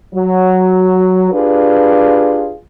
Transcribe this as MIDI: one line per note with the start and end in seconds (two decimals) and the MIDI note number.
0.14 1.31 54
1.32 2.53 62
1.32 2.53 65
1.32 2.53 67
1.32 2.53 68
1.32 2.53 71